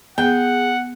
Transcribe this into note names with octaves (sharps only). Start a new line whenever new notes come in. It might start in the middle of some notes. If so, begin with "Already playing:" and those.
B3 G#4 F#5 G5